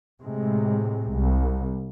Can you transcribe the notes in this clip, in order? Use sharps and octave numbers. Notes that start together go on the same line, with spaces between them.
A2 C3 G#3
C2